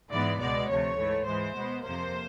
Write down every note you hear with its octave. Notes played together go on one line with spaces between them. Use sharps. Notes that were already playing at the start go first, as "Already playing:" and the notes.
G#2 E3 G#3 B3 D5
C#2 B2 G#3 B3 D5
D2 C3 F3 A3 C#5
G#2 E3 A3
G#2 E3 G#3 C5
B2 G#3 B3
F2 C3 F3 A#3 C5